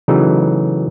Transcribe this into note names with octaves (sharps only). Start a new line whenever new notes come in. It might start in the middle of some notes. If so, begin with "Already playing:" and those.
C#3 E3 F#3 A3 D#4